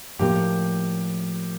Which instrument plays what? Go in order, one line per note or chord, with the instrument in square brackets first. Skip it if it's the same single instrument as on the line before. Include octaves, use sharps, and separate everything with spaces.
[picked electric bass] A2 F3 A#3 [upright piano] G4